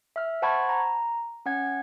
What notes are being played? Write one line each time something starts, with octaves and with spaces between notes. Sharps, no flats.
E5 F6
C5 F#5 A5 B5 C#6 G#6
A#5
C#4 F#5 G#6